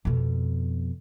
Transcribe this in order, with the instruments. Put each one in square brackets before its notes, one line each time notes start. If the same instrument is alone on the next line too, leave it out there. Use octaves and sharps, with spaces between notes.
[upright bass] F2 B2